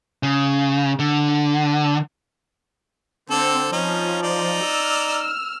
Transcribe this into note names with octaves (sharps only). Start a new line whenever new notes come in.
C#3
D3
D3 C4 A4
F3 C#4 D#4
D#4 D5
E6 F6